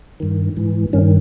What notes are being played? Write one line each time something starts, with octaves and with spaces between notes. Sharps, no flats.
G2 D#3
G#2 E3
G2 D#3 C#4